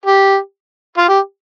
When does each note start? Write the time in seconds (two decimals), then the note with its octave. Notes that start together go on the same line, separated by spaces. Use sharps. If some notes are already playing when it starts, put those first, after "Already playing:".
0.06 G4
0.98 F4
1.08 G4